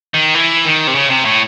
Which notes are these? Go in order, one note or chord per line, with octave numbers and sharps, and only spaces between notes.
D#3
E3
D#3
C3
C#3
C3
A2